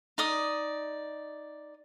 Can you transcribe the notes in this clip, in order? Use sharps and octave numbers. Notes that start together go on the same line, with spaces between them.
D#4 D5 D#6